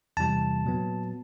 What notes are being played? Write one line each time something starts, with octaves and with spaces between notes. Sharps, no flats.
E2 C3 E3 G3 A5
A#2 F#3 B3